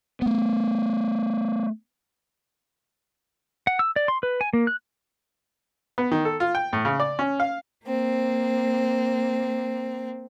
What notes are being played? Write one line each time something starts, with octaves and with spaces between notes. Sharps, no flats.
A3 B3
F#5
E6
D5
C6
B4
G#5
A#3
F#6
B3
D#3
A4
F4
G5
A2
C#3
D5
C#4
F5
A#3 C4